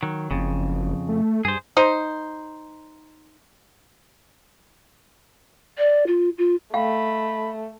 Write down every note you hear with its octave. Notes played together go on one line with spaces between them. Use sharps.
D#3 F#3
F#1 F2 C#3
A3
G2 G#4 C5
D#4 C5
D5
F4
F4
A3 D#5 F5 G5 B5